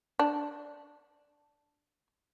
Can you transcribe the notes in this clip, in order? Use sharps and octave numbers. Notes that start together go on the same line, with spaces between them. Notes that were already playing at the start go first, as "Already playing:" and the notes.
D4